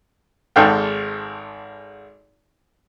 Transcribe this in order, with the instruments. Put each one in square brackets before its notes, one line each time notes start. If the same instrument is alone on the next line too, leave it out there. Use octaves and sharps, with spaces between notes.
[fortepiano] G#1 G#2 A4 F5 G5